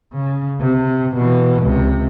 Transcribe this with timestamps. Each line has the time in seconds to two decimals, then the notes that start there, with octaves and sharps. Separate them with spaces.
0.13 C#3
0.60 C3
1.15 B2 E3
1.62 C#2 C3